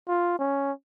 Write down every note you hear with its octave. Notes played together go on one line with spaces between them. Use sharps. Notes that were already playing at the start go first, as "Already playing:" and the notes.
F4
C#4